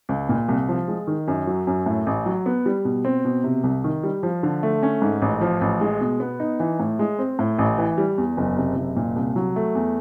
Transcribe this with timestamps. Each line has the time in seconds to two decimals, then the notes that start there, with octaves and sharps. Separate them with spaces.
0.09 C#2
0.29 A#2
0.48 C2
0.68 F3
0.88 G#3
1.07 D#3
1.28 F#2
1.47 F#3
1.67 F#2
1.86 A2
2.06 A1
2.26 F#3
2.46 B3
2.66 G3
2.85 B2
3.05 C4
3.25 B2
3.44 C3
3.63 C2
3.84 D#3
4.03 G3
4.23 F3
4.43 D3
4.63 A3
4.83 C#4
5.02 G#2
5.22 A1
5.41 F3
5.61 A1
5.81 G#3
6.01 B2
6.20 B3
6.40 D#4
6.60 E3
6.80 A2
6.99 G#3
7.19 C4
7.39 A2
7.58 A1
7.78 E3
7.98 G3
8.18 E2
8.37 F#1
8.57 C3
8.76 F#1
8.97 A#2
9.16 C2
9.36 F#3
9.56 A3
9.75 E2